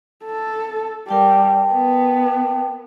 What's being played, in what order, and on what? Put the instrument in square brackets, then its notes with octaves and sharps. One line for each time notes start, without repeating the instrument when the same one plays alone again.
[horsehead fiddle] A4
[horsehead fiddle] G3 [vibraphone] A#4 G5 A5
[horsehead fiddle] B3